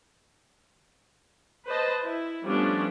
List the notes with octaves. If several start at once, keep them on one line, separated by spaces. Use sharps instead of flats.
B4 C5 D#5 A5
E4
F3 G3 A3 B3 C#4 D4